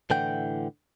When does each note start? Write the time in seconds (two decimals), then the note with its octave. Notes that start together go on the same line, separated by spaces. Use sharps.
0.10 A2 D3 E3 F#5 G5